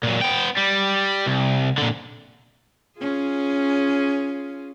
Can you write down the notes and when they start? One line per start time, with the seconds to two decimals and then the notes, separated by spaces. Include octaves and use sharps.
0.03 A#2 F#3
0.21 B3 G5
0.57 G3
1.26 C2
1.78 A#2 D3
2.99 C#4 F4 G#4